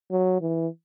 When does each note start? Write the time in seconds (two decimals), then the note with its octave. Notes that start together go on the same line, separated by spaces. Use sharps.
0.11 F#3
0.41 E3